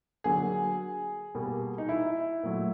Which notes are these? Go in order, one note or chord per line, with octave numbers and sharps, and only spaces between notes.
D3 F#3 A#3 G#4
B2 G3 A#3
D#4
E4
A#2 F#3 A3